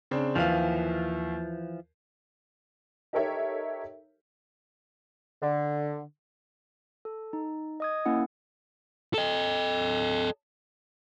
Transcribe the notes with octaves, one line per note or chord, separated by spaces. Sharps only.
C#3 C4 D4
D#2 E3 F3 F5
D#4 G4 A4 A#4 C#5 E5
D3
A4
D#4
D#5 D#6 G#6
A#3 C#4 E4 F#5
A4 D#5